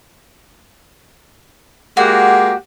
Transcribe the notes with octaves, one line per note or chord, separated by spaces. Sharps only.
G#3 A#3 F#4 G4